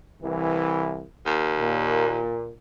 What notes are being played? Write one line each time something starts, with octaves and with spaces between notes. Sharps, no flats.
C2 E3
D#2
A#2